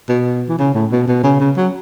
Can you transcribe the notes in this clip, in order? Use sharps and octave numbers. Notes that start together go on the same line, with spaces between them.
B2
E3
C#3
A2
B2
B2
C#3
C#3
F#3